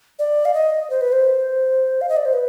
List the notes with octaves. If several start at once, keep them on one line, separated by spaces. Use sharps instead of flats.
D5
F5
D#5
C5
B4
C5
F5
D#5
D5
C5
B4